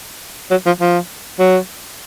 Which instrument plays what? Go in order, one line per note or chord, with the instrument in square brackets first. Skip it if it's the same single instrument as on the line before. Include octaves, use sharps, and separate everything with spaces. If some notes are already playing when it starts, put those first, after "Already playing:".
[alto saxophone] F#3
F3
F3
F#3